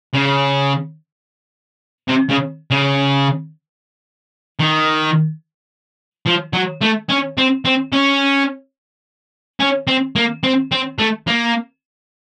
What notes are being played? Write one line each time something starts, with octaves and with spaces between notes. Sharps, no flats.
C#3
C3
C#3
C#3
D#3
F3
F#3
A3
C#4
C4
C4
C#4
C#4
C4
A#3
C4
C4
A3
A#3